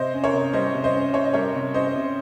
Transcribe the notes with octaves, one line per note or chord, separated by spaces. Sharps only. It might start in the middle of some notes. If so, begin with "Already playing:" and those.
Already playing: C3 C5 D#5
C#4
A#4 C#5
C3
G3 C5 D#5
C3
C5 D#5
C#4
C3 C#5
D#5
G3 A#4 C#5
C3
C#4 C5 D#5
C3